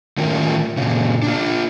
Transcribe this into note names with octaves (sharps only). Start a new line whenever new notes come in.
A2 D#3 C#4 F4 A#4
A#2 C#3
D4 F4